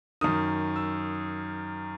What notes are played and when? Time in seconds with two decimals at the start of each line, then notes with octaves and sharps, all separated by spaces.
0.21 F#2 D#3 D#6
0.76 E6